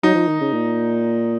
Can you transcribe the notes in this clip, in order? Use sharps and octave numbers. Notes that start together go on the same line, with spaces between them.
F#3 D#4
F3
D#3
C#3
A#2